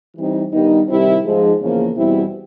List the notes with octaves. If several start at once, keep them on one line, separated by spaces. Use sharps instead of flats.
E3 G3 C4 D#4
G2 D#3 G3 B3 D#4
C3 D#3 G3 C4 E4
G#2 F3 G#3
E2 C#3 F3 A#3
E2 B2 G3 C4 E4